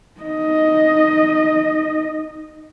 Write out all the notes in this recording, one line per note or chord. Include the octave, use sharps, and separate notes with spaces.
D#4 D#5